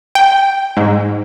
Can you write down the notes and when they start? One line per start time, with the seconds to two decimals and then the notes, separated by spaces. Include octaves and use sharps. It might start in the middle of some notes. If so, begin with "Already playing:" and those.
0.15 G5
0.77 G#2